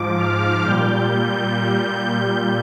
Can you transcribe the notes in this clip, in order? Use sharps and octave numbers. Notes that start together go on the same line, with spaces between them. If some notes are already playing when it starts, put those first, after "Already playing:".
Already playing: G#2 F3 D6
F6
A#2 G3 G6
G6